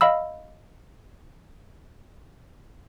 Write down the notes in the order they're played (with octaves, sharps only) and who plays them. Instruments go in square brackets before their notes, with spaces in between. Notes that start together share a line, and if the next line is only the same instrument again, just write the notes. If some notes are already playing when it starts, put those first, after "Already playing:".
[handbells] D#5 F5 B5 E6